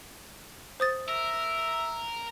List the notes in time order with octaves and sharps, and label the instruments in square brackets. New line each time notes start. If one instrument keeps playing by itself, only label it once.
[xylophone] C5 D#6 A6
[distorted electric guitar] A#4 [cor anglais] E5